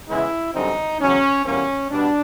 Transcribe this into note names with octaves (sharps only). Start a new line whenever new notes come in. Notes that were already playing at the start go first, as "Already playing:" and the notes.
E2 C#3 E3 G#3 E4
F#2 D3 G3 C4 D#4
E2 C#3 F#3 C#4
E2 B2 G3 A#3 C#4
B2 G3 B3 D4